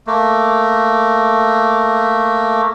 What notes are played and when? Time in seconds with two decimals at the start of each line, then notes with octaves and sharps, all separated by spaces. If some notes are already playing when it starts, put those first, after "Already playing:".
0.07 A3 A#3